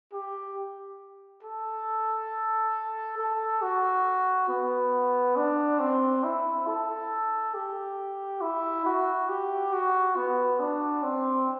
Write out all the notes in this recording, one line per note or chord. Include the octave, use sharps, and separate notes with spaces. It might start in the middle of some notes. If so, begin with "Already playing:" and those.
G4
A4
A4
F#4
B3
D4
C4
E4
A4
G4
E4
F#4
G4
F#4
B3
D4
C4